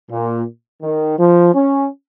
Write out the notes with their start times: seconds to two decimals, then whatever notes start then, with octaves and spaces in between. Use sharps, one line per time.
0.10 A#2
0.82 D#3
1.17 F3
1.53 C#4